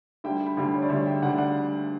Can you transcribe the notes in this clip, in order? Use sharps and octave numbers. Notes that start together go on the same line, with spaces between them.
D2 D3 G3 E5 G5
G5 B5
D2 D3 G3
C#5
D5
D2 D3 G3 C#5 E5
E5 G5
D2 D3 G3 D5 F#5
D5 F#5